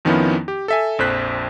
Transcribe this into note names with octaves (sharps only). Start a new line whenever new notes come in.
F2 D#3 F3 B3 C#4 E4
G4
A4 E5 G#5
A#1 F2 C5 F#6 B6